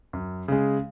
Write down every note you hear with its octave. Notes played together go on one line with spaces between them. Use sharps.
F#2
C#3 G#3